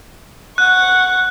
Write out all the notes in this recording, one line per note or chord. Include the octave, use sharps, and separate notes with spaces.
F#5 C#6 F#6